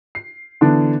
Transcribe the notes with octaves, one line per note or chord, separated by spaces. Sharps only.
C7
D3 E3 B3 D4